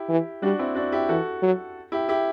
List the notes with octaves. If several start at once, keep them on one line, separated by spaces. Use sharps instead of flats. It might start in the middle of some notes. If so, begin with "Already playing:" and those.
Already playing: E4 G4
E3
G3 D4 F#4
C4 E4
D4 F#4
E4 G4
E3 F#4 A4
F#3
E4 G4
E4 G4